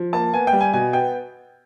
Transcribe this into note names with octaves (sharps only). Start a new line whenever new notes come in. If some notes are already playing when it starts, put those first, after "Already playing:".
Already playing: F3
A#3 A5
B3 G#5
G5
G3
G#5
B2 G#5
B3 G5